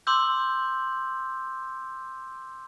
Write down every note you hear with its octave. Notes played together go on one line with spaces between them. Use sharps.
C6 D6 E6 G6